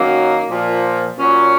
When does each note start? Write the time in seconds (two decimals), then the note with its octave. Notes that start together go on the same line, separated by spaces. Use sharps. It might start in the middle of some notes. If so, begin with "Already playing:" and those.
Already playing: F#2 D#3 F#3 A#3
0.50 A#2 F3
1.18 A#2 F#3 C#4